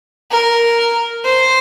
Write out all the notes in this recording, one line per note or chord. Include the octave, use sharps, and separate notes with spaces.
A#4
C5